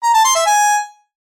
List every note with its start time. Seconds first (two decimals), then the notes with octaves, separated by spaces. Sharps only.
0.03 A#5
0.14 A5
0.25 C6
0.36 E5
0.46 G#5